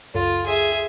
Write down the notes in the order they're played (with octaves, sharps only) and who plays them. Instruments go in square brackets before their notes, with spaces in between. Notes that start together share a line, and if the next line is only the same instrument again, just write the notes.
[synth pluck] C#2 F#2 A4 [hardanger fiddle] F4
[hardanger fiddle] G#4 E5 [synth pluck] C6